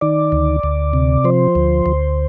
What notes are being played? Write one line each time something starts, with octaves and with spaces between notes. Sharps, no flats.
D#3 D5
D2
D2
C3
F3 C5
D2
D2